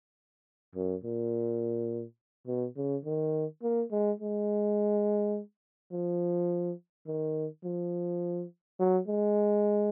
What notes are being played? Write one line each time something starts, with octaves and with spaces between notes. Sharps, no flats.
F#2
A#2
B2
C#3
D#3
A#3
G#3
G#3
F3
D#3
F3
F#3
G#3